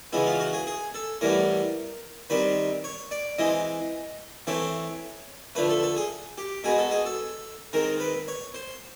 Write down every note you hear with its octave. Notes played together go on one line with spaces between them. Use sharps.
C#3 E3 G#3 B3 E4
F4
F#4
G#4
G#4
A4
A2 E3 G3 B3 A#4
D#3 G3 C4 B4
C#5
D5
E3 G#3 C4 D#5
E3 A3 C4 C#5
D3 F3 A3 B4
A4
A4
G#4
G4
B2 G#3 B3 G#4
A4
G#4
A4
D#3 G#3 C4 A#4
B4
C#5
C5